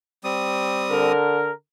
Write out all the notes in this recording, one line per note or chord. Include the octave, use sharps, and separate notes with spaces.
G3 C4 D#6
D3 A#4